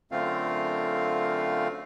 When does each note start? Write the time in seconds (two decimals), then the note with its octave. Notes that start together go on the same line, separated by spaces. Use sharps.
0.11 F#2 D3 A3 C4 F4 F5